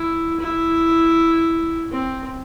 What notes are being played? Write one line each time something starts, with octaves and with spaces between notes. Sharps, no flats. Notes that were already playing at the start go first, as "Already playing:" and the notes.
Already playing: E4
E4
C4